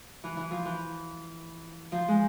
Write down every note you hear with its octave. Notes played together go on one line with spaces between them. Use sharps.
E3
E3
F3
E3
F3
G#3